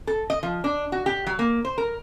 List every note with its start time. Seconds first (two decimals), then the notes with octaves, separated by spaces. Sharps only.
0.07 A4
0.30 D#5
0.43 F3
0.64 D4
0.92 F#4
1.06 G4
1.27 F#3
1.39 A#3
1.65 C5
1.78 A#4